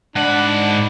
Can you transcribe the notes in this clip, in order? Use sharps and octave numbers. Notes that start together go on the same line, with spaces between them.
G#2 D4 F#5 B5